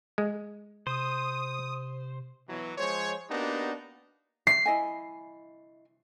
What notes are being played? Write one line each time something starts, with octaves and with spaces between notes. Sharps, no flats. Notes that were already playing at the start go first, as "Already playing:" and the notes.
G#3
C3 C5 D#6
B2 E3 F#3
F3 G#3 C5 C#5
A#3 B3 D4 D#4 F#4 G4
C7
E4 D#5 G#5